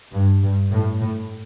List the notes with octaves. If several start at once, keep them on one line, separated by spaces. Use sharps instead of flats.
G2
G2
A2
A2